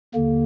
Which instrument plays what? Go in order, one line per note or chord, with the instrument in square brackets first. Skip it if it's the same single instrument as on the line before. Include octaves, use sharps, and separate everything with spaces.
[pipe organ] D#2 D3 A#3